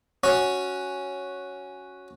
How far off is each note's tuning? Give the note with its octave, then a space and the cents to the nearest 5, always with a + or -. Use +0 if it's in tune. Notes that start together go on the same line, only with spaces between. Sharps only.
C#4 +0 F#4 +0